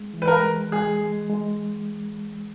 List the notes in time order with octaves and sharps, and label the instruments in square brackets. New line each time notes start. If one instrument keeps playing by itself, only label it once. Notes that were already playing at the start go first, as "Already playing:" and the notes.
Already playing: [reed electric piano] G#3
E3
[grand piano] B4
A#4
[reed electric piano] G#3
[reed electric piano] G#3 [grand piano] G#4
[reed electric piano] G#3
G#3